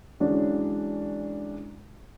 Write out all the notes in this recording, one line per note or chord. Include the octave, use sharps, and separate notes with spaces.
D3 E3 F#3 G#3 C#4 D4